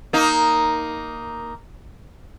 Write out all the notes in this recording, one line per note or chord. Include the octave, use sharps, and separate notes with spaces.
A#3 D#4